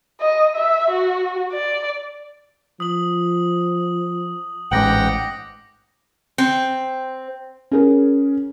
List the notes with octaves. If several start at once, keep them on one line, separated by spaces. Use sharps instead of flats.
D#5
E5
F#4
D5
F3 D#6 F#7
A1 G#2 F#5 G5 D6 A#6 F#7
C4
C#4 G#4 A#4